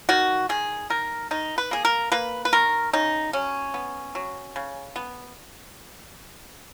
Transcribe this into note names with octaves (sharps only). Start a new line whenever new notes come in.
D#3 F#4
D#3 G#4
D#3 A#4
D#3 D#4
B4
A#3 G#4
A#4
A#3 B4
B4
D#3 A#4
C#3 D#4
F#3 C#4
B3
F#3
C#3
B3